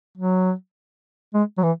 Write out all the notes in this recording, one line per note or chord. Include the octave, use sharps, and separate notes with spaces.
F#3
G#3
F#3
E3